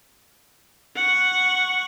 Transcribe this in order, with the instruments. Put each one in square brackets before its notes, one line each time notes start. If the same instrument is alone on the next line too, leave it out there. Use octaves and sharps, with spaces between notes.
[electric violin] F#5 C#6